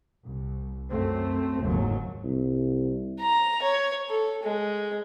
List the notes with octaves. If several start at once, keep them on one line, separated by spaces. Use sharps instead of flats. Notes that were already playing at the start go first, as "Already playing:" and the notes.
C2
F#2 A3 C4
F#1 D#2 G#2 F#3
C2
A#5
C#5
A4
G#3